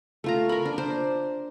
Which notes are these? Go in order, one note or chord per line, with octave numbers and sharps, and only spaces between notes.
A3 F4 A#5
A#4 B5
D4
D4 C5